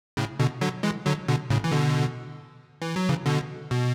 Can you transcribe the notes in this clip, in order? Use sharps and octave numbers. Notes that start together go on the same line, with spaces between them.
A2 C#3
B2 D3
D3 F#3
E3 G#3
D3 F#3
B2 D3
A2 C#3
E3
B2 D3
E3
F#3
C#3 E3
B2 D3
B2